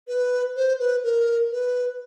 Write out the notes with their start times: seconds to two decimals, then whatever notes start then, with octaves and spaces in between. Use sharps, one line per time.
0.08 B4
0.56 C5
0.80 B4
1.04 A#4
1.51 B4